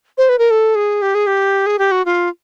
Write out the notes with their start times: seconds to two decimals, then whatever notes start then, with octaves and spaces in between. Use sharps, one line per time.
0.18 C5
0.29 B4
0.39 A#4
0.51 A4
0.75 G#4
1.02 G4
1.15 G#4
1.27 G4
1.66 G#4
1.79 G4
1.91 F#4
2.05 F4